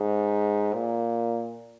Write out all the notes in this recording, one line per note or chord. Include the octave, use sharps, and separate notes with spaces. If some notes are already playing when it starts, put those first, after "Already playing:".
Already playing: G#2
A#2